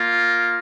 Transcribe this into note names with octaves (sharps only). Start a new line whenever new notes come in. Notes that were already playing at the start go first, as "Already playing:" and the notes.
Already playing: A#3 F4